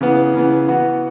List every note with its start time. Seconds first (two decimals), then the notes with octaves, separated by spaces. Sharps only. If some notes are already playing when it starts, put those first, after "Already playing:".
0.01 C#3 E3 B3
0.34 C#3 E3 B3
0.68 E3 B3 F#4